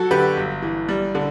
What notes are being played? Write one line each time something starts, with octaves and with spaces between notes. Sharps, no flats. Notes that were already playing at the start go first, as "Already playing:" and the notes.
Already playing: F#3 F#4 A4
D3 G4 B4
G1
E3
G3
D3